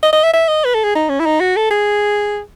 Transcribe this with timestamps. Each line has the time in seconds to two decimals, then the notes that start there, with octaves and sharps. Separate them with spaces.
0.03 D#5
0.13 D#5
0.23 E5
0.33 E5
0.48 D#5
0.65 B4
0.74 A4
0.84 G#4
0.95 D#4
1.09 C#4
1.20 E4
1.26 D#4
1.40 F#4
1.56 A4
1.71 G#4